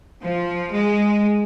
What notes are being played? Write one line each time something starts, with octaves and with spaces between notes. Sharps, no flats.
F3
G#3